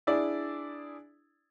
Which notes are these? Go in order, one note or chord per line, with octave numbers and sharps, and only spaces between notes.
D4 E4 G#4 D5